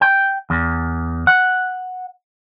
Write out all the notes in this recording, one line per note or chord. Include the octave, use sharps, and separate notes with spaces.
G5
E2
F#5